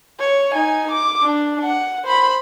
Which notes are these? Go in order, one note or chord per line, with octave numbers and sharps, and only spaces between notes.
C#5
D#4 G#5
D6
D4
F#5
C5 B5